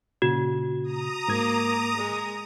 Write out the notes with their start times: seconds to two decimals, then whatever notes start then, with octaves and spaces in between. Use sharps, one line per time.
0.22 A#2 C#3 F#4
0.83 A#5 D#6
1.28 G#2 A#3 D6 G#6
1.97 G#3